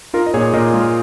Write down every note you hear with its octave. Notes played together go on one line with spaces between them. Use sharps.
D#4 F4 A#4
D#5
A#2 G#4 C#5
A#2 A#4 D#5
G#3 F4 A#4